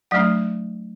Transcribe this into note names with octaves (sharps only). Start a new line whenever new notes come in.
F#3 A3 D4 F#5